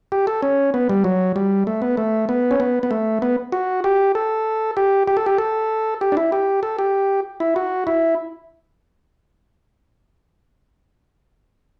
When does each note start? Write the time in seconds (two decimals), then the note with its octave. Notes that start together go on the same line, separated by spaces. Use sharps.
0.12 G4
0.27 A4
0.42 C#4
0.74 B3
0.89 G3
1.04 F#3
1.36 G3
1.67 A3
1.82 B3
1.97 A3
2.29 B3
2.51 C#4
2.60 B3
2.83 B3
2.91 A3
3.22 B3
3.52 F#4
3.84 G4
4.15 A4
4.77 G4
5.08 G4
5.17 A4
5.26 G4
5.38 A4
6.01 G4
6.12 D4
6.17 E4
6.32 G4
6.63 A4
6.79 G4
7.40 E4
7.56 F#4
7.87 E4